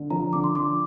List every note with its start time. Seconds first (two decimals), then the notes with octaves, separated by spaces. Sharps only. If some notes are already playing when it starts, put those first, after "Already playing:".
Already playing: D3
0.10 F3 A#5
0.33 D3 D6
0.44 C6
0.55 F3 D6